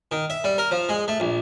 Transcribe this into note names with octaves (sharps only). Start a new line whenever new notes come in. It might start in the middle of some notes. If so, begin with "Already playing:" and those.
D#3
E5
G3
A#4
F3
G#3
A3
A#1